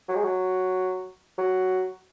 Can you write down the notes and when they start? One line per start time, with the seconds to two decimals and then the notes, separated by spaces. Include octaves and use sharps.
0.08 F#3
0.15 G#3
0.24 F#3
1.38 F#3